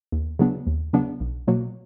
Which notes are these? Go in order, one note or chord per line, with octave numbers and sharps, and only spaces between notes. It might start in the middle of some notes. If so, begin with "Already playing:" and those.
D#2
C#3 F#3 B3 D4
D#2
C#3 F#3 B3 D4
B1
B2 F#3 A#3